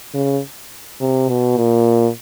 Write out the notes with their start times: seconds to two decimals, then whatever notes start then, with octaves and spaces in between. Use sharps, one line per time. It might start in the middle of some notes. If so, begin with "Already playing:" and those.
0.14 C#3
1.01 C3
1.29 B2
1.57 A#2